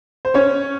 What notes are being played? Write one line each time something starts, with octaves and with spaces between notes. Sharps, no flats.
C5
C#4 C#5